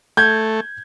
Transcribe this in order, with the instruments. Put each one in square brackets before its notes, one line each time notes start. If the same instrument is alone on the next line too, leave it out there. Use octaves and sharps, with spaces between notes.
[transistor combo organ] A3 [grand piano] G6 G#6